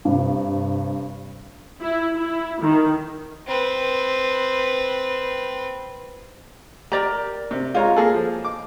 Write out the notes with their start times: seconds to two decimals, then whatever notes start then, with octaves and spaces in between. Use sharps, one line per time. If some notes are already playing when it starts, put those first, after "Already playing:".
0.05 G2 C3
1.81 E4
2.15 E4
2.62 D#3
3.47 C4 B4
6.92 G4 A#4 D5 A#5
7.51 C3
7.75 G#3 F4 C#5 A#5
7.97 A#3 G#4 A4
8.14 F3
8.45 D6